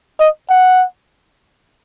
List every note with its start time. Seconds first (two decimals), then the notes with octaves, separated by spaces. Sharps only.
0.20 D#5
0.50 F#5